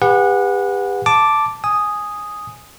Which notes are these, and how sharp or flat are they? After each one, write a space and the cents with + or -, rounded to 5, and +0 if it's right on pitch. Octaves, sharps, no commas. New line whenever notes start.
G4 +40 B4 +0 F#5 -20
A5 +0 D6 +0
G#5 +0 D#6 +0